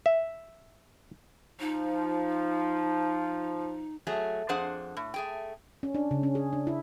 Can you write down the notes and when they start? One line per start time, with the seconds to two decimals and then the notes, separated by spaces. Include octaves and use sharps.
0.06 E5
1.60 F3 D#4
4.07 F#3 A3 G#4
4.49 F2 D4 G#4 C5 F#5
4.97 A2
5.14 A3 G#4 G5
5.83 C#4
5.95 D4
6.11 C#3
6.23 C#4
6.35 G#4
6.53 D4
6.67 E4